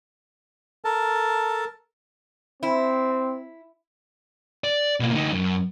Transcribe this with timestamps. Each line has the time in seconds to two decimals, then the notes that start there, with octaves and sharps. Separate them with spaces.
0.85 A4 A#4 A5
2.63 C4 E4
4.64 D5
5.00 B2 A#3
5.13 D2 D#4
5.32 F#2